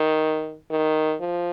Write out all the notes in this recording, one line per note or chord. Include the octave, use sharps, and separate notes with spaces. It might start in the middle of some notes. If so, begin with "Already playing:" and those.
Already playing: D#3
D#3
F3